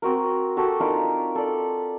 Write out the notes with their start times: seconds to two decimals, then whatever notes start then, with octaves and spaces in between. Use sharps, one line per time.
0.02 C4 F#4 A#4
0.57 F#4 G4 A4
0.80 D4 D#4 F4 A#4
1.35 A4 D5